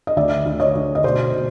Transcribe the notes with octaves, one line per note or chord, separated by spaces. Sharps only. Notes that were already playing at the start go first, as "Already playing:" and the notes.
D#5
D2 D5 E5
D2
C#5 D#5
D2
D#5
B2 C5 D5
B2